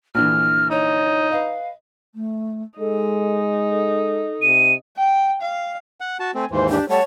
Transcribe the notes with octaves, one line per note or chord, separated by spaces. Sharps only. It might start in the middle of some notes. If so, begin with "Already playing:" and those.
A#1 D3 E3 F6
D#4 C#5
B4 D#5 F5
A3
G#3 D#4 A4
A4
C3 D#7
G5
F5
F#5
F#4 A5
A3 C4 G#5
D#2 G#2 E3 C5 C6
D4 G4
G3 A3 C#5 F#5 A5